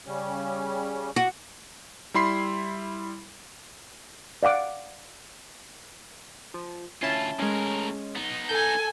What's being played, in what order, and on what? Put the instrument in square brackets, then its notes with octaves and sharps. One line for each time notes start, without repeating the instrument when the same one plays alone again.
[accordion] C#3 G3 C#4
[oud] F#4
[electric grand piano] G3 E4 B5 C6 C7
[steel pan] D5 F5 F#5 D6
[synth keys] F3
[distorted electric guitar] D2 F4 [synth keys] C#4 E4 A5
[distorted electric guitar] A2 A#4 [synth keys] G#3 C#4
[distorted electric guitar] B3 D#4
[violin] A4 G#5 [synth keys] G6